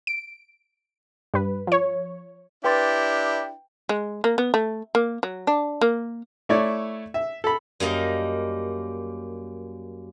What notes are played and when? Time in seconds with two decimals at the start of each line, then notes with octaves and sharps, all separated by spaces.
0.07 D7
1.34 G2 B4
1.67 F3 C#5
2.64 D4 E4 G4 B4 G5 C6 A6
3.89 G#3
4.24 A#3
4.38 B3
4.54 A3
4.95 A#3
5.23 F#3
5.47 D4
5.81 A#3
6.49 A3 E4 C#5 D5
7.14 E5
7.44 A4 B5
7.80 F#2 G3 A#3 D#5 F5